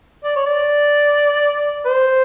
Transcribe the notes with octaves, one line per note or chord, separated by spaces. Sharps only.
D5
C#5
D5
C5